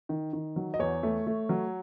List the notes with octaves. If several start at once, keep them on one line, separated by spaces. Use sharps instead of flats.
D#3
D#3
F#3
D#5
E2 C#5
A3
A3
F#3